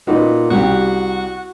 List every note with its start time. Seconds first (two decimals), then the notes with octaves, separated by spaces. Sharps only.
0.07 A#2 D#4 F#4 B4
0.50 C2 F#4 G4